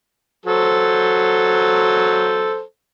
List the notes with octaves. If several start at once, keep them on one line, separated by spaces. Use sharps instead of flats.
F#3 A4 C5